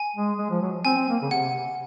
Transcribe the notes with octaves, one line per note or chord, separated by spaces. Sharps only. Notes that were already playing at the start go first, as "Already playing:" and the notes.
Already playing: G#5
G#3
G#3
F3
F#3
C4 G#5
C4
A#3
C#3
C3 F#5